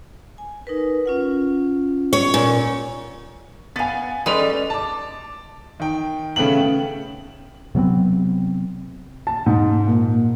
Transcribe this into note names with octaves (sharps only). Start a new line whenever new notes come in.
G#5
D#4 A#4 B4
C#4 F4 F#5
C#5
A#2
B3 F5 G#5 A6
G3 G#3 C#4 A4 B4 D#5
A5 D6
D#3 G5
C#3 A3 B3 C#4 G5 F#7
C3 F#3 B3 C4
A5
G#2
A#2